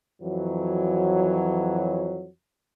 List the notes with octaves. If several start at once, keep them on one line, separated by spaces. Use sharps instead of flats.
F2 E3 F#3